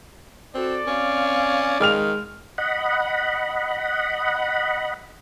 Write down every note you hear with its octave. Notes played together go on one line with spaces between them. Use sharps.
C4 F#4 A4 D5
C4 C#4 F5
D#3 G#3 F6 F7
D#5 F#5 B5